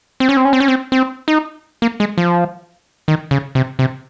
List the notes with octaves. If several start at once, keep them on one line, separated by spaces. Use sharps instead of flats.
C4
C#4
C4
C#4
C4
C#4
C4
C4
D#4
A#3
G#3
F3
D#3
C#3
C3
C3